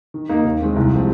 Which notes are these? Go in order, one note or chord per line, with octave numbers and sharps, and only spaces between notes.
D#3
A#3 D#4 A#4
D#2
D#3 G#3 C4
C2
C3 F3 G#3 C4